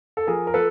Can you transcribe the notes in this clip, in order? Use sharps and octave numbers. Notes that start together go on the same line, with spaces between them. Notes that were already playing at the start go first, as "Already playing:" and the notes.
A4
F3 G#4 A#4
A#4
F3 A4 B4